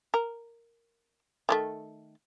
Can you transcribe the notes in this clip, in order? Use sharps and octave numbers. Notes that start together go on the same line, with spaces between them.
A#4
D#3 G#3 A3